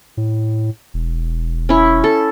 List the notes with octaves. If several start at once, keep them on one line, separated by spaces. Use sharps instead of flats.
A2
E1
C#4 E4
A4